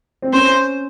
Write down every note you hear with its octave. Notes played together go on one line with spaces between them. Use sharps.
C4
C#4 C5